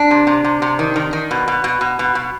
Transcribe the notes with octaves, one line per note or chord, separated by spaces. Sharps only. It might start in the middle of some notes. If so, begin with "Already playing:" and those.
Already playing: D4
C3
C3
C3
C3
D#3
D#3
D#3
B2
B2
B2
B2
B2
B2